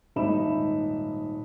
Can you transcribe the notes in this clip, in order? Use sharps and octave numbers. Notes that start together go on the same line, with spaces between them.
D#1 G#2 D#4 E5 B5 E7